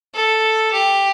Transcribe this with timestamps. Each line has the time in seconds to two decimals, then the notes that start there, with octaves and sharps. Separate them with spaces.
0.14 A4
0.72 G4